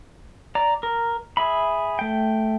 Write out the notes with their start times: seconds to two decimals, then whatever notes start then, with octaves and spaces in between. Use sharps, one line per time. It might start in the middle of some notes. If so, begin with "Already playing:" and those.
0.55 D5 A#5
0.83 A#4
1.37 G#4 E5 B5
1.99 A3 G5